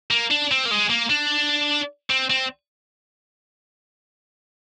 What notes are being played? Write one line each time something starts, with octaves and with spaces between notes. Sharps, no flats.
A#3
D4
C4
A#3
G#3
A#3
D4
C4
C4